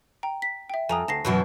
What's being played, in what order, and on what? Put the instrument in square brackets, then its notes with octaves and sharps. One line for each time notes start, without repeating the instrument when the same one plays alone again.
[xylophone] G5 A#5
B6
E5 G5
[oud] F2 [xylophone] G#5 A#5 D#6
[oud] D2 [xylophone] A5 A#6 C7
[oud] F#2 B2 E3